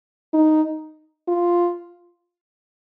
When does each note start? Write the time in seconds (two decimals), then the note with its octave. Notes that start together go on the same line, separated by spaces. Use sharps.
0.34 D#4
1.28 F4